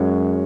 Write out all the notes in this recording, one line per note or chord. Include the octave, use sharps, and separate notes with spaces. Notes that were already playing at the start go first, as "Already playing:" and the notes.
Already playing: F#2 G#3 C#4 F#4 C#5